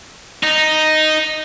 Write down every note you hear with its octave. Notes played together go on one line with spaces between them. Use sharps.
D#4